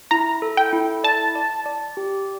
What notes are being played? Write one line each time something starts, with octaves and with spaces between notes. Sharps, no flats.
E4 A#5
A4
G5
E4
D5 A5
D5
D5
G4